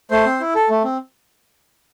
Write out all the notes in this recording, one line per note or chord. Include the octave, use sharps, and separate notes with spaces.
A3 C5
C4
E4
A4
A3
C4